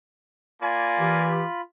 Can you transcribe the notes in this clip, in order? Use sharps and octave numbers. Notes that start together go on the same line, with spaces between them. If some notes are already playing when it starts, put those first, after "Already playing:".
A#3 F4 D5 G#5 B5
E3 G4